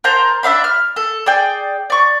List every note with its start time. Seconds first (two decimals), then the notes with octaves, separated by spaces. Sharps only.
0.04 A#4 C5 A5 A#5
0.43 D4 E5 F5 B5
0.64 F6
0.96 A4
1.26 G#4 D5 G5
1.90 D5 C#6